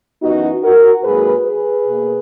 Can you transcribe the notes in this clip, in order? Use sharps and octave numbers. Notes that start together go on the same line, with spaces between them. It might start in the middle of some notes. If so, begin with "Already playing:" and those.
F#2 E3 B3 D#4 F#4
F#4 A#4
G#2 F#3 A#3 G#4 B4
G#4 B4
B2 A#3